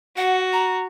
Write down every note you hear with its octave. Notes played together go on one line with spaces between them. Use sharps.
F#4 F#5
A#5